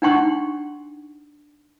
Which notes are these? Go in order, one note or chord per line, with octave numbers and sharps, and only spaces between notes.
D4 D#4 F#5 G5 C6 C#6